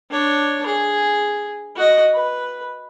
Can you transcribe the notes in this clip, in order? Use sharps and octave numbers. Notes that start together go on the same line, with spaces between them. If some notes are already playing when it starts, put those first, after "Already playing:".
D4 C#5
G#4
F#4 D#5
B4